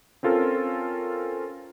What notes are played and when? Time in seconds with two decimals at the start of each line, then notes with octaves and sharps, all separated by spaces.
0.23 C4 C#4 F4 A4 A#4